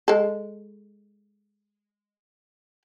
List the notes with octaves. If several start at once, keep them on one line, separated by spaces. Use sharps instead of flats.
G#3 A4